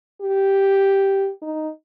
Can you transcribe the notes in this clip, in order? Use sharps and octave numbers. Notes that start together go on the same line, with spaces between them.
G4
D#4